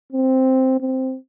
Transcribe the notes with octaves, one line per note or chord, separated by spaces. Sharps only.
C4
C4